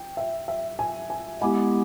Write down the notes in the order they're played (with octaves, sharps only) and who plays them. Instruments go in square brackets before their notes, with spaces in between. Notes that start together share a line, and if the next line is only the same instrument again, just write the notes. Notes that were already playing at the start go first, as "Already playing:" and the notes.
Already playing: [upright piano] G5
E5
E5
G#5
G#5
[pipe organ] G#3 B3 E4 G4 [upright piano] G#5